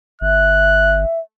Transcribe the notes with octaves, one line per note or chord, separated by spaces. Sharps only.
G1 E5 F#6